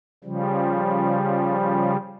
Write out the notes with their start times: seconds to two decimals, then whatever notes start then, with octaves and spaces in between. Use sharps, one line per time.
0.24 C#3 F3 G3